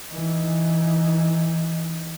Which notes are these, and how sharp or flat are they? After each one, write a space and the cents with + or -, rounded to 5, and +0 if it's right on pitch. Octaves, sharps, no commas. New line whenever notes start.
E3 +0 D#4 +0